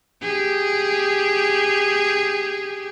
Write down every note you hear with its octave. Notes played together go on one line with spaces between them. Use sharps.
G4 G#4